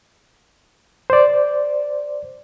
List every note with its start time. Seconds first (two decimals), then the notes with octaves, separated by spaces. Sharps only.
1.10 C5 D5